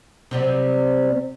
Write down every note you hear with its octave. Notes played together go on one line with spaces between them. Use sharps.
C3 F#3 G3